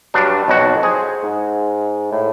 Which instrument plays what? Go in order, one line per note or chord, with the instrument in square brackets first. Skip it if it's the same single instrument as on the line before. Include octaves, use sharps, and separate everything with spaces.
[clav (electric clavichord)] G2 D4 [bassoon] F#3
[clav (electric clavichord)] B1 F2 F#4 [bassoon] D#4
[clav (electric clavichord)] G#4 [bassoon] C5
[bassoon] G#2
A2